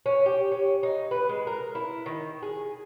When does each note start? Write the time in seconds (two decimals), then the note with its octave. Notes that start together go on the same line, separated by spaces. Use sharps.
0.06 C#4
0.26 G4
0.52 C#4
0.83 D#4
1.11 B4
1.29 G#3
1.47 A#4
1.75 E4
2.06 D#3
2.42 G#4